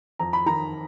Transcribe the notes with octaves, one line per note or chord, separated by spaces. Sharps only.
F2 A#5
B5
D#3 A#5